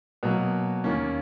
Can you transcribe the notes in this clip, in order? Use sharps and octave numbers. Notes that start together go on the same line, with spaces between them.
B2 F#3 A#3
D#2 D#3 A#3 C#4